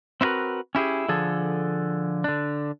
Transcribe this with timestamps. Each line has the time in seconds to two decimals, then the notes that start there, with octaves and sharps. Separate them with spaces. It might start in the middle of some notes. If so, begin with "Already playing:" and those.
0.21 C4 E4 F#4 A#4 B4
0.75 C#4 E4 G4 G#4
1.09 D3 F3 G#4 A4
2.24 D3 D4